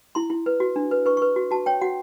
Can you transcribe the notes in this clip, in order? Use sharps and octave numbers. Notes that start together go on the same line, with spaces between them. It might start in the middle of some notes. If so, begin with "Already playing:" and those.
E4 C6
E4
B4
F#4
D4
B4
B4 C#6
B4 C#6
F#4
F#4 A5
C#5 G5
F#4 F#5